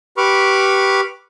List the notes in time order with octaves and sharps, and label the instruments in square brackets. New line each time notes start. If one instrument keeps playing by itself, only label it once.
[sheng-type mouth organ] G4 B4 B5 C#6 D6 F6